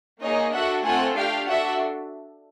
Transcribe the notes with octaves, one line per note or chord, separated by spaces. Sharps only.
A#3 D#4 G#4 C#5 D#5
D4 F#4 A4 E5 F#5
A3 C4 F4 A4 F#5 G#5
A3 D4 G4 F5 G5
D4 F#4 A4 E5 F#5